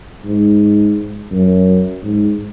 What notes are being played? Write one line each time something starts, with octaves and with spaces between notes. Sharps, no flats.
G#2
F#2
G#2